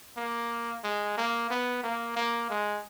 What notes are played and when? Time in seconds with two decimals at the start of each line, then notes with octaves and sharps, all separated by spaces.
0.17 A#3
0.84 G#3
1.17 A#3
1.50 B3
1.84 A#3
2.17 A#3
2.50 G#3